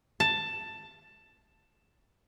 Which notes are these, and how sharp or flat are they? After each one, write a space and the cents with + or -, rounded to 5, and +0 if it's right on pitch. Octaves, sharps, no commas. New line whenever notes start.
A5 +10